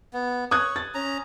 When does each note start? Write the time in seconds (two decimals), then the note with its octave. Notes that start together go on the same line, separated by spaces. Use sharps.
0.13 B3
0.51 C#5 D#6 F#6 G#6
0.76 A6
0.95 C#4 A#5